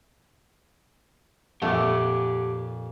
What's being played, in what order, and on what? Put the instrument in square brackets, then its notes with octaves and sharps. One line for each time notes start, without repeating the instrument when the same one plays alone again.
[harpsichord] F2 A#2 [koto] A3 [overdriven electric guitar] G4 A5 [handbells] F#5 D6